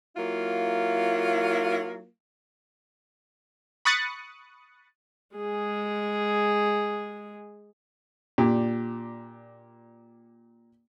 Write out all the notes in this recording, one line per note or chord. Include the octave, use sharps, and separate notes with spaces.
F#3 A#3 E4 F4
B5 C#6 D#6 F#6 A6 C#7
G#3 G#4
A#2 D4 G4